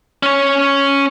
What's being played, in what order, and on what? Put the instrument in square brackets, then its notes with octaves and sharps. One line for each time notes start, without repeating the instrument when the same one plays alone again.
[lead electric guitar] C#4 C#5